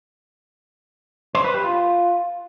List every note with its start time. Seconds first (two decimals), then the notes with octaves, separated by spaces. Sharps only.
1.35 C5
1.44 B4
1.54 G4
1.64 F4